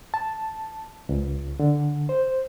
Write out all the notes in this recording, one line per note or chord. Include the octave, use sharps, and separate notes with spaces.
A5
C#2
D3
C5